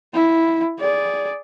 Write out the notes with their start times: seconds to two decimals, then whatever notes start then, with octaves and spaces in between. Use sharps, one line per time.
0.13 E4
0.80 G#4 D5